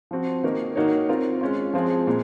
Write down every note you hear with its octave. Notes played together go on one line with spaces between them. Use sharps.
F3 C4 F#4
D#3 A#3 D#4 F#4 A#4
D#3 A#3 D#4 F#4 C#5
C4 F4 A#4
G#3 C#4 F4
F3 G#3 C4 F4 G#4
A#2 G#3